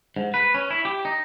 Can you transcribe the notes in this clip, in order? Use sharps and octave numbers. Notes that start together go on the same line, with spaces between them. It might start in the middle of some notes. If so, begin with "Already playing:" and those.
G#2
B4
C#4
E4
G4
D#4